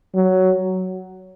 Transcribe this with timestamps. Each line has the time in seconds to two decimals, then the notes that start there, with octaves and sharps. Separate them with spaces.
0.15 F#3